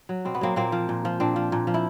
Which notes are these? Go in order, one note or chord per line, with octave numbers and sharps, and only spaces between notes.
F#3
B2 C4
B3
F#3 A#3 C4
A#2 A#3 C4
F3
A#2
F3
A#2 C4 D4
F3
A#2
F3
E4